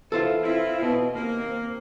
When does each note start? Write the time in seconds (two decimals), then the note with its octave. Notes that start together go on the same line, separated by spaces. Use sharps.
0.12 E3 F4 A4 C5 E5
0.43 C4 E4 F4
0.82 B2
1.15 D#2 A#3 C4